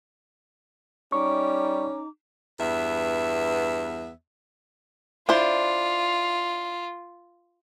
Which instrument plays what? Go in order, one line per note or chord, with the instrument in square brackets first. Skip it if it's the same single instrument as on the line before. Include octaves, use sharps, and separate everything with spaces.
[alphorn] G3 [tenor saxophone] C#4 [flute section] D#4 A#5 D6 [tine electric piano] C#6
[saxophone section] E2 G2 B3 E5
[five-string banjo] D4 E4 C5 [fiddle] F4